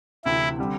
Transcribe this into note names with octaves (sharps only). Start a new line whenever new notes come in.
D2 C3 E3 E4
D3 G3 C4